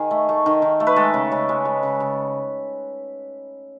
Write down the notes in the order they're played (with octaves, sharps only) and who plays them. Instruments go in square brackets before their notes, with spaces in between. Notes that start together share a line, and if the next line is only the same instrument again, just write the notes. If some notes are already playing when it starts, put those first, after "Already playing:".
Already playing: [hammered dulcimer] D#3 G#4
A3
A3
D#3
D#3
A3
B4
G#3 A4
C#3
C#3
G#3
G#3
C#3
C#3